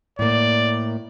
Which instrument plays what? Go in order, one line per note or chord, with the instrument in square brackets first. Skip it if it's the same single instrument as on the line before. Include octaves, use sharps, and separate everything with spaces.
[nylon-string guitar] A2 A#3 [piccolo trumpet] D5